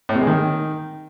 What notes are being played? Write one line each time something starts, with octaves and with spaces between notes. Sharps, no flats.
A2
C3
G#3
D#3